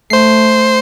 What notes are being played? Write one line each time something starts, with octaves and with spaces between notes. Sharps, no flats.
A3 C5 C7